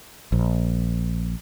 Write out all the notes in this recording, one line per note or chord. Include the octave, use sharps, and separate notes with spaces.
A#1